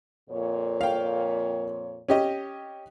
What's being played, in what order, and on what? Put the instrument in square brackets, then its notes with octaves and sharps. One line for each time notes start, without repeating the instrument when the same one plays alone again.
[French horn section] F2 A#2 C#5
[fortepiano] F5 G5
C#4 G4 D#5